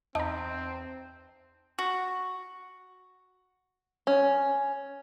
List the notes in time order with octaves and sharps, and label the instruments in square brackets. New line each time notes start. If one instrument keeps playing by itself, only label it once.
[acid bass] E2 [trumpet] C4 [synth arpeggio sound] D#4 A#5 [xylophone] A5
[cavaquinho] F#4
[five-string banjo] C#4